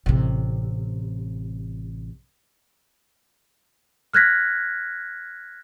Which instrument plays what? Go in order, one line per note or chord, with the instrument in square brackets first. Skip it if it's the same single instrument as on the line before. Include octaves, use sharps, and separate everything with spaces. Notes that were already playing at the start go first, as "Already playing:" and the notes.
[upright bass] A1 C3
[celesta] F6 F#6 G#6 A#6 B6